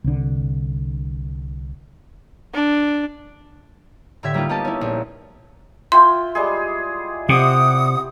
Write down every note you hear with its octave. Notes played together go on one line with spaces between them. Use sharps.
C2 D3
D4
A2 D3 G4 E5 G#6 B6
G3 A#3 D#4 F4
A#3 B3 G4 D#5 A5
C#4 E4
A#1
E4 F4 G5 C6
G3 G#3 G#4
C3 G4 F#5 D#6